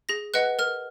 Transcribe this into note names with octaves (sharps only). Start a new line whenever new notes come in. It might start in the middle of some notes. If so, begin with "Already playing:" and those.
G#4 A#6
B4 D#5 F#5 F#6
A#4 F6